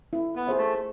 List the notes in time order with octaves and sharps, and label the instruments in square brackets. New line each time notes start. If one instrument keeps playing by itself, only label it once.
[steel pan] E4
[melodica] B3
[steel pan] G#4 C5 E5
[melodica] A3